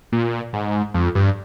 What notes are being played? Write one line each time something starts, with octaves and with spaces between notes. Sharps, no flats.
A#2
G#2
F2
G2